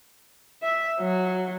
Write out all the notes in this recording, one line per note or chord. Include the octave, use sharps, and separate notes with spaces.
E5
F#3